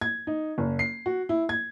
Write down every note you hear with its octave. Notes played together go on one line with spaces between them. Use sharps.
G#6
D#4
F#1
C7
F#4
E4
G#6